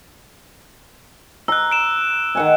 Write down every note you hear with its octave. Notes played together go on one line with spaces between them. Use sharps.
A#5 E6 F#6
D7 E7
D#3 F#5 G#5